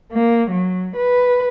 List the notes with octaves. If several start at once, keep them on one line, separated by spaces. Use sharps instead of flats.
A#3
F#3
B4